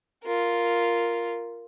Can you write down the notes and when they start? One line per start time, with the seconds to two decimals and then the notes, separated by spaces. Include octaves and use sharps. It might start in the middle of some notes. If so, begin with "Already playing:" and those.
0.24 F4 A#4